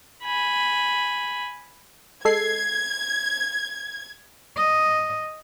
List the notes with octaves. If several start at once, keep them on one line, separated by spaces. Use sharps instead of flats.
G#5 B5
G#3 A4 G#6 C7
D#5